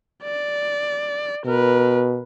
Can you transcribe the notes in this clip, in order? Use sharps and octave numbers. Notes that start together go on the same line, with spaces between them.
D5
B2 A#4 B4